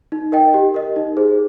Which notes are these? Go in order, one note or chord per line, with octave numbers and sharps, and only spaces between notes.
D#4
A#4 D#5 G5
G4
A#4 D#5
D#4
G#4 C5